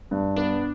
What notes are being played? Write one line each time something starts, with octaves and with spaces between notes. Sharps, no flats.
G2
B3 D4